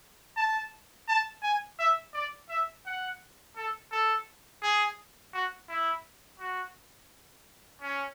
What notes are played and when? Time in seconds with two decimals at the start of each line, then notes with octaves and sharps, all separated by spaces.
0.37 A5
1.09 A5
1.43 G#5
1.79 E5
2.14 D5
2.50 E5
2.86 F#5
3.57 A4
3.92 A4
4.63 G#4
5.34 F#4
5.69 E4
6.40 F#4
7.82 C#4